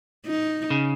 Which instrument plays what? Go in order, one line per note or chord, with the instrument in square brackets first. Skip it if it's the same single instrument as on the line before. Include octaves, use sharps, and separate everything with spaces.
[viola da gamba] D#4
[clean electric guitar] C#3